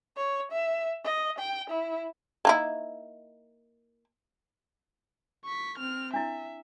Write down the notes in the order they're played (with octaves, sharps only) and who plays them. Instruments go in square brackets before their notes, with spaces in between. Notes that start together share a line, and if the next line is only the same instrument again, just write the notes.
[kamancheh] C#5
E5
D#5
G5
E4
[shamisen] A#3 D#4 E4
[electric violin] C#6 B6
C4 F6
[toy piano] D4 E4 [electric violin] E5